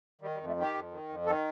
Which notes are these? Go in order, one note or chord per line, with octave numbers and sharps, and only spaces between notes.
D#3 G3
G3
F2
A3
D#3 G4
F2
D#3
F2
D#3 A4